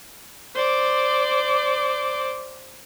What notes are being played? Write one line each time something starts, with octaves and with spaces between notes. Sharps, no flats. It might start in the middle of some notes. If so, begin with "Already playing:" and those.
C5 D5 D6